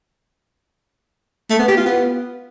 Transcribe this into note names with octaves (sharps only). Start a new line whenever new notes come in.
A3
B3
G4
F4
B3